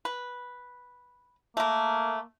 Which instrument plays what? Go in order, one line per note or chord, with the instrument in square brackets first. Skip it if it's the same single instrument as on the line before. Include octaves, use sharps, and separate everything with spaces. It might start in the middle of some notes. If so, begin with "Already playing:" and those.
[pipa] B4
[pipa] A3 A#4 [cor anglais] A#3